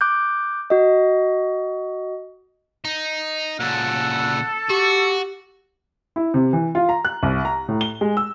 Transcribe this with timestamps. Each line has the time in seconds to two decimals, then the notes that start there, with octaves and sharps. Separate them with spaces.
0.01 D6 F#6 G6
0.70 F#4 D#5
2.85 D#4
3.60 A#2 C#3 A4 F#5
4.70 F#4 G4 C#6
6.16 E4
6.34 C3
6.53 E3
6.75 F4
6.89 A#5
7.05 F#6
7.23 C2
7.45 A#5
7.68 A2
7.81 G7
8.01 G#3
8.17 E6